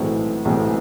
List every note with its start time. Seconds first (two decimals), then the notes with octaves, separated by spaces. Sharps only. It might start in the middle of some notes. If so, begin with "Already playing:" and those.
Already playing: B1 A2 E3 G#3 C4
0.45 B1 A2 E3 G#3 C4